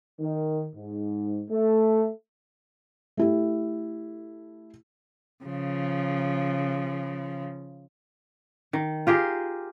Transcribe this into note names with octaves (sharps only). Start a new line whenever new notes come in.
D#3
G#2
A3
A3 E4 G4
C#3 F3
D#3
F4 G4 G#4 A#4